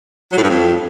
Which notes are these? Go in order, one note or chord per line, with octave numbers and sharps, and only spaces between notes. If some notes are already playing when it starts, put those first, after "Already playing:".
F#3
A2
G2
F2